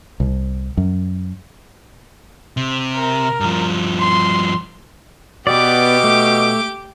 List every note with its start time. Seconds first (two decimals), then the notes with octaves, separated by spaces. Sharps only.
0.20 C2
0.77 F#2
2.57 C3
2.95 A#4
3.40 G2 F3
4.00 C6
5.47 B2 B3 G4 D5 D6
6.04 A3